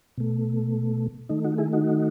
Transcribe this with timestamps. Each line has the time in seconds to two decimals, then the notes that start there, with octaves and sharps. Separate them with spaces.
0.18 B2 A3
1.29 D#3 A3 D#4
1.44 D#4 F#4
1.58 E4 G#4
1.73 D#4 F#4